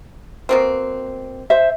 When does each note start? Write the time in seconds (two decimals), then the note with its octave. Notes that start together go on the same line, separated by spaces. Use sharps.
0.49 B2 A#3 C4
1.50 C5 E5